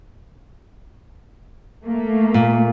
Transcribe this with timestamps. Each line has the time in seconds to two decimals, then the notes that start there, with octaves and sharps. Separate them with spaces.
1.86 A3 A#3
2.34 A#2